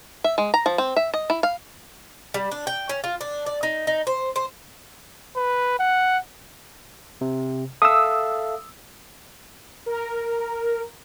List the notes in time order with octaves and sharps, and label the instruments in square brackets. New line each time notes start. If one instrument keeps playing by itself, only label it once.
[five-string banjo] E5
G#3
A#5
F3
C4
E5
D#5
E4
F5
[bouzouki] G3
D4
G5
C#4
F4
D4
D5
D#4
D#4
C5
C5
[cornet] B4
F#5
[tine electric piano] C3
[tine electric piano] A4 E5 F5 [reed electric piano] D#6 E6
[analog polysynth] A#4